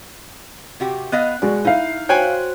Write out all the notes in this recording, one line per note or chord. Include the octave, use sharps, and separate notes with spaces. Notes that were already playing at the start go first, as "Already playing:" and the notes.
C3 F#4 G4
B3 D#5 F5 F#6
B2 G#3 F#4 D5
D#4 E4 F5
F#4 C5 C#5 G5 G#5 F#6